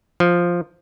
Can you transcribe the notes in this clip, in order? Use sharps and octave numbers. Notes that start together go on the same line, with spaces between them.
F3